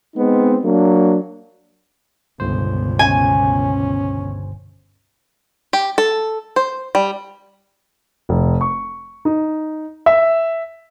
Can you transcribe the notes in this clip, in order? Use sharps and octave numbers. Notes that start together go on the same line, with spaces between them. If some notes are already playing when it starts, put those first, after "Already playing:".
G#3 B3 C4 D#4
F#3 A#3 D4
G1 C#2 B2 C5
C#4 G#5
G4
A4
C5
G3
F1
C#6
D#4
E5